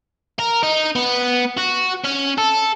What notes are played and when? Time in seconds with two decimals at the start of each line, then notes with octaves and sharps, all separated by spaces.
0.39 A#4
0.63 D#4
0.96 B3
1.58 F#4
2.05 C#4
2.38 A4